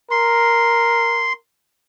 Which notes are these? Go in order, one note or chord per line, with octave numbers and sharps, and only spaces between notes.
A#4 C6